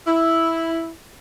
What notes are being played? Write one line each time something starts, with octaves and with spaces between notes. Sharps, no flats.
E4